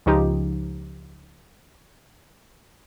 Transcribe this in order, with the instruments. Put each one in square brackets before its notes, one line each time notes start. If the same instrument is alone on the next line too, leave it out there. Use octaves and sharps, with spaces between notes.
[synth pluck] C#2 C#3 F3 D#4 G4